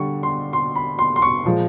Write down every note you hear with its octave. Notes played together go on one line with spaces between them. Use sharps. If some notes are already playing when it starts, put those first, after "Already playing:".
Already playing: D3 G3 C#6
C6
C6
B5
C6
C6
C#6
A#2 F3 G#3